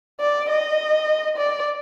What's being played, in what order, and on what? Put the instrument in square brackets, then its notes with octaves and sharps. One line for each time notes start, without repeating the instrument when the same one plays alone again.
[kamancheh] D5
D#5
D5